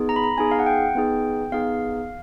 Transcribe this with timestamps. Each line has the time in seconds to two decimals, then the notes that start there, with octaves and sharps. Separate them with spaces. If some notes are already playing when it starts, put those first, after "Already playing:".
Already playing: B3 D#4 G#4
0.09 A#5
0.16 B5
0.24 A#5
0.37 B3 D#4 G#4 G#5
0.51 F5
0.59 F#5
0.66 G5
0.95 B3 D#4 G#4
1.52 B3 D#4 G#4 F5